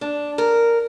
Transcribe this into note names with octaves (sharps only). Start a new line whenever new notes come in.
D4
A#4